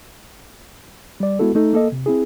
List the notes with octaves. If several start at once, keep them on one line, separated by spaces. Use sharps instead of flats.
G3 D5
G#3 B3 E4 F#4 A4
A3 D#4 A4
A#3 A4 D#5
C3
C4 E4 G#4